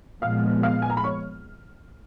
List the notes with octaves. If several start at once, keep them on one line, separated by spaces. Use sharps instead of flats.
A#2 F3 G#3 B3 F5 F6
F5 F6
G#5
A#5
B5
C#5 C#6